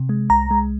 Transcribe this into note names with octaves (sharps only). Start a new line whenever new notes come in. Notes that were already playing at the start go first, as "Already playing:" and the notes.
Already playing: C3
G#3
C2 A#5
G#3